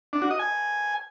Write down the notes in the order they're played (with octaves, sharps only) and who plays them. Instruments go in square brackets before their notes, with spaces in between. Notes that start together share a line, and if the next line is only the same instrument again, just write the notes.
[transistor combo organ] D4
F#4
D#5
G#5